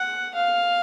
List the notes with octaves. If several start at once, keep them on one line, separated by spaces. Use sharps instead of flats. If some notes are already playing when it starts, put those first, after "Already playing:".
Already playing: F#5
F5